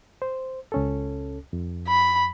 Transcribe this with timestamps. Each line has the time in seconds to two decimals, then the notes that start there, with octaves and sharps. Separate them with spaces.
0.22 C5
0.72 C#2 C#4 A4
1.53 F2
1.88 B5